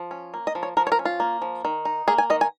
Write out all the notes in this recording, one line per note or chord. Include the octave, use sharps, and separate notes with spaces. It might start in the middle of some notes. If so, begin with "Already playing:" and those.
Already playing: F3
C#4
A#3
D#5
F3
C#5
F3 A#4
C#5
A#4
C#4
F4
A#3
F3
D#3
D#4
A#3 G#4
G#5
D#3 D#5
G#5